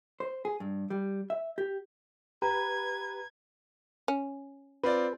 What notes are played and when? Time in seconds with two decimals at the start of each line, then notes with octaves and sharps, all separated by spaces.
0.20 C5
0.45 G#4
0.60 G2
0.90 G3
1.30 E5
1.58 G4
2.42 G4 B4 A#5 G#6
4.08 C#4
4.84 C4 F4 B4 D5